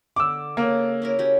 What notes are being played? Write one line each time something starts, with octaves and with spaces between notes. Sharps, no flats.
D3 D6 E6
C#3 A#3 A4
C#4 E4 A#4
C#4 F#4 G4